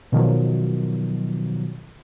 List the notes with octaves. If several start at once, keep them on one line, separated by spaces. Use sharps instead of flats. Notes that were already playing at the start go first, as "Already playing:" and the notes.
B2 D#3 F3 F#3